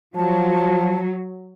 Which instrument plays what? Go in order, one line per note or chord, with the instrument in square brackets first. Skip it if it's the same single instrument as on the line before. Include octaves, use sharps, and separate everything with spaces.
[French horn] F3 [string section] F#3 [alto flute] A5